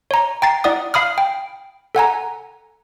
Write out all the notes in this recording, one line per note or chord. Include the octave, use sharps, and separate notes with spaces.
C#5 A#5
G5 A#5 A6 C7
E4 D5 F#5 D#6
F5 B5 D#6 F6
G5
A4 F#5 G#5 A#5